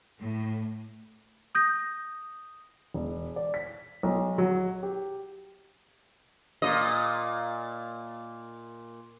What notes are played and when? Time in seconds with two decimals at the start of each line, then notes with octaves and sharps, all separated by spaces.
0.20 A2
1.55 D#6 G6 A#6
2.94 E1
3.36 D5
3.54 B6
4.03 B1
4.38 F#3
4.83 G4
6.62 A#2 D#5